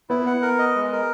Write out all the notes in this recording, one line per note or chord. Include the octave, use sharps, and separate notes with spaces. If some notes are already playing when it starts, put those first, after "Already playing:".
B3 E4
F#5
A#4
D#5
G#3
A#4